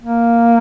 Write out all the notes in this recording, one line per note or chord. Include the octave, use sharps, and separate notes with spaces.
A#3